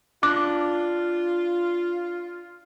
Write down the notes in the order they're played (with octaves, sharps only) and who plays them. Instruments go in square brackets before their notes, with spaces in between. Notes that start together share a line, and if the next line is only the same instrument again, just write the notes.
[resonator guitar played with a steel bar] D4 [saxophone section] F4 [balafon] D6 [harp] F#6